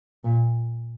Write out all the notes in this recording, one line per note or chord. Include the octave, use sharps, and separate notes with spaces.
A#2